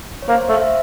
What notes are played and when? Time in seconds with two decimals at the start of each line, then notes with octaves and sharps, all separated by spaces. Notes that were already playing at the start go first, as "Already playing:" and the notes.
0.22 C#5
0.28 A#3 C5
0.44 A3 C5
0.53 F5
0.60 E5